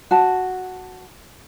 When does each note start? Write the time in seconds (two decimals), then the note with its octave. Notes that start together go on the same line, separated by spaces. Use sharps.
0.11 F#4 A5